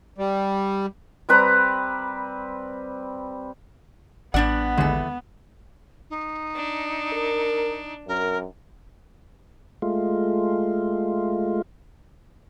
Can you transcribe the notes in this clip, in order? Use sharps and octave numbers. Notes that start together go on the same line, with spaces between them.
G3
G3 C4 B4 A#5
A1 G3 B3 D4 D5 F#5
D#2 D3 E3 G#3 A4
D#4
D4
A#4
F#2 A#4
G#3 A3 F4